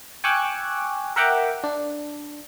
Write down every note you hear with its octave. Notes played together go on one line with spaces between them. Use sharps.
G5 G#5 C#6 D6 E6 F#6
A#4 E5 F#5 G5 A#5 D6
D4